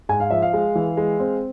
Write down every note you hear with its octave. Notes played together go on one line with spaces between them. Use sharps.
G#2 G#5
F5
F3 E5
F5
G#3
E3
G#3
C4